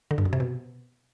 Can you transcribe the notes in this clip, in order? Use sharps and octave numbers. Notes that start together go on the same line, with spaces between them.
D3
G2
F#2
C3
B2